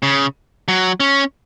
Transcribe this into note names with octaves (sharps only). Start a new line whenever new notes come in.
C#3
F#3
C#4